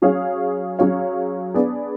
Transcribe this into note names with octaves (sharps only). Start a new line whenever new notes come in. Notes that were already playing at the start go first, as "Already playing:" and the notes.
F#3 C#4 G#4 C#5 F5
F#3 C#4 G#4 C#5 F5
B3 D4 G#4 D5